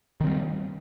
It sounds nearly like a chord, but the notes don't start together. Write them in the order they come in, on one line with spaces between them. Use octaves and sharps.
D#3 C4 G3